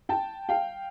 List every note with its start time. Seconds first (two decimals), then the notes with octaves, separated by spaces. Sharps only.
0.09 G5 A5
0.49 F5 G5